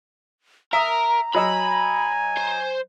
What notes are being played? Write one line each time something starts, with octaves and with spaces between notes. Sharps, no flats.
A#4 E5 A#5 D#6
F#3 D#5 G#5 B5 E6
C5